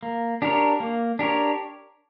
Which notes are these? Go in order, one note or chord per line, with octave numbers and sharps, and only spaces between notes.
A#3
D4 G4 A#4 C#5
A#3
D4 G4 A#4 C#5